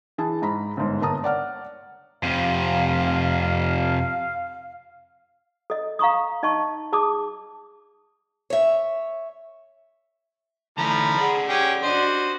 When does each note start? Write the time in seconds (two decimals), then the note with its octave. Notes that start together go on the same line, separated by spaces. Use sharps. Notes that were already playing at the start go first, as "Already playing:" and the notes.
0.18 E3 G#4 A5
0.42 G#2 A#5 B5
0.77 G1 G#2
1.01 G1 A#3 A5 A#5 D#6
1.23 C#5 D5 F#5 F6
2.23 F2 C3 F5
5.70 A4 D#5
5.99 F5 A#5 C#6 D#6
6.43 D#4 D#5 A5 C#6
6.93 G#4 A5 D6 D#6
8.50 C#5 E5
10.78 D3 E3 F3 A3 A#5 B5
11.18 G#4 D5 F#5
11.49 C#4 G4 G#4 G5
11.83 D4 F#4 C5 D#5